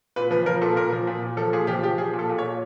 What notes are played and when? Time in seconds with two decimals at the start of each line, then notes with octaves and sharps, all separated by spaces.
0.16 A#2 B4
0.31 F3 B4
0.46 F3 A#4
0.61 A#2 A4
0.76 A#2 A#4
0.92 F3
1.07 A#2
1.22 A#2
1.37 F3 A4
1.53 A#2 G#4
1.67 F3 G4
1.83 F3 G4
1.98 F3 G#4
2.13 A#2
2.19 A4
2.29 A#2
2.38 C#5
2.43 A#2